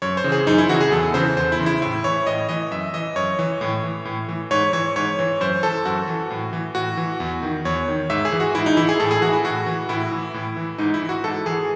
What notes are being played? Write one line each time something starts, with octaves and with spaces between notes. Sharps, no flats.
F#2 C#5
C5
C#3 E3
G#4
F#2 D#4
E4
C#3 E3 F#4
G#4
E2 A4
C#3 E3 C5
E2 C5
E4
C#3 E3
E4
A2 E4
E3 C#5
A2 D#5
E3 D#5
F#2 E5
E3 D#5
F#2 C#5
E3
A2
E3
A2
E3
G#2 C#5
E3 C#5
G#2 C#5
E3
F#2 C5
E3 A4
F#2 F#4
E3
A2
E3
A2 F#4
E3
E2
D#3
E2 C#5
D#3
G#2 E5
G#4
E3
F#4
G#2 E4
D#4
E3 E4
G#4
A2 A4
G#4
E3 F#4
E4
A2 F#4
E3
A2 E4
E3
A2
E3
G#2 D#4
E4
E3
F#4
G#2 A4
E3 G#4